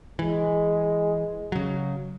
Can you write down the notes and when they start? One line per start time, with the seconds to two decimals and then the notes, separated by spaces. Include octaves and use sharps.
0.19 E3 G#3
1.52 C#3 F#3